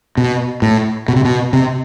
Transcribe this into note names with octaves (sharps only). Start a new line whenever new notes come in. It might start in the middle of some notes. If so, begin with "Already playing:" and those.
B2
A2
B2
C3
B2
C3